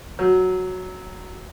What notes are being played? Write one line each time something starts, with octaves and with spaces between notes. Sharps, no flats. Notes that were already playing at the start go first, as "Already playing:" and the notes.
F#3